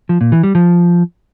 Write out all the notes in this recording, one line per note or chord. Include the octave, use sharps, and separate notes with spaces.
F3
A#2
E3
G3
F3